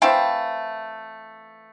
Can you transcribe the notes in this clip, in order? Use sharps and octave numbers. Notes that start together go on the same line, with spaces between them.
E3 A3 C4 E4 F5 G5